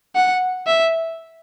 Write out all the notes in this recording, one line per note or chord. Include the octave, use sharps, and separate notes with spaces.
F#5
E5